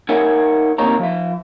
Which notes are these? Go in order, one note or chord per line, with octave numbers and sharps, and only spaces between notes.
D#4 A#4 C#5 E5 F#5 G#5
D2 C3 A#3 D#4 C#5 A#5
F3 E5